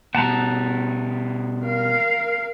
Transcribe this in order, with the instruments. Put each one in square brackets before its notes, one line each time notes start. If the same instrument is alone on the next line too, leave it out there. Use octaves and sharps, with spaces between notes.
[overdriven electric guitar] B2 G3 [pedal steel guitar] F#5 A5 A#5
[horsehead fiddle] A#4 F5